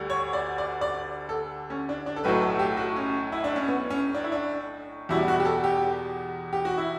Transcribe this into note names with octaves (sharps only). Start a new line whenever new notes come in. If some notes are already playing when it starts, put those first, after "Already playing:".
Already playing: D2 D3 G3
C#5
D5
D5
D5
A4
C#4
D4
D4
A4
B1 A2 F#3 A3 B4
A4
G4
F#4
C#4
E4
D4
C#4
B3
C#4
D4
E4
D4
E2 B2 G3 E4
F#4
G4
A4
G4
G4
F#4
E4